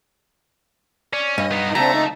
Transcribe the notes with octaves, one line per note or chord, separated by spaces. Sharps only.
C#4 D5
G2 D#5
B3 D#4
C#2 A3 C4 D4 A#5
D#4